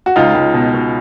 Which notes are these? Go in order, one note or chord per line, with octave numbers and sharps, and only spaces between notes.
F#4
C#2 D#4 F4
C#2
B2
B2